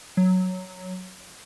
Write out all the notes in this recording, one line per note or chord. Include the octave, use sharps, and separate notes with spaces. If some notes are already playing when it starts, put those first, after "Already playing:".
F#3